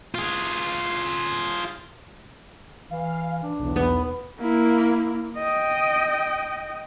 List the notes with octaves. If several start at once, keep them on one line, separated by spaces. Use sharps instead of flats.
F4 G#4
E3 F5
D4
B1 E2
B3
A#3 E4
D#5 G5